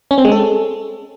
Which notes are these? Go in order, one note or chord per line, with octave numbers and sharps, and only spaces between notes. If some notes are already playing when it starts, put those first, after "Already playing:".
C#4
C4
G#3
A4